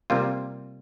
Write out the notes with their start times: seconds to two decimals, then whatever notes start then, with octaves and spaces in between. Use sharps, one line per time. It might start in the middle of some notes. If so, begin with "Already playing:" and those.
0.10 C3 G3 A#3 F4